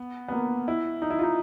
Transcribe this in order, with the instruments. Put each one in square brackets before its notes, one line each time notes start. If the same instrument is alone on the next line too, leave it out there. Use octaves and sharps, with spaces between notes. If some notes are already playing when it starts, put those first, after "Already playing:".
Already playing: [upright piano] B3
B3
A#3
E4
D#4
E4
F4
D#4